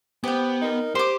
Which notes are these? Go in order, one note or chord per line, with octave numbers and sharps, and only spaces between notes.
B3 G4 C5 G5
D#4 A#4
G4 C5 C6 D6